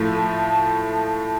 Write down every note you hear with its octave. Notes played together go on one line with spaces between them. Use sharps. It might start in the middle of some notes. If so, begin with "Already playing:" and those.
Already playing: A2 F3 A3